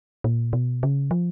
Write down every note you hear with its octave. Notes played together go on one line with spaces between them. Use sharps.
A#2
B2
C#3
F3